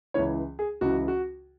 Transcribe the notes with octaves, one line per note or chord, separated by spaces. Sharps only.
C#2 C#3 E3 C#5
G#4
C#2 C#3 E3 F#4
F#4